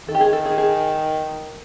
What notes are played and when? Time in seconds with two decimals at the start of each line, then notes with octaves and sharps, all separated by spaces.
0.08 D#3 A4
0.15 G4
0.21 G#4
0.33 A4
0.45 G#4
0.58 G#4